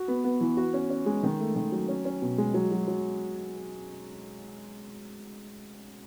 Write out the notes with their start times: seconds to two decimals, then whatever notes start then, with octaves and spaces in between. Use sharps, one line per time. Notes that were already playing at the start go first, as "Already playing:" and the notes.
Already playing: F#4
0.08 B3
0.24 B3
0.41 E3
0.57 F#4
0.74 C#4
0.90 C#4
1.06 G#3
1.23 D#3
1.40 A3
1.56 D#3
1.72 F#3
1.88 C#4
2.05 C#4
2.22 B2
2.38 G#3
2.54 F#3
2.72 F#3
2.88 F#3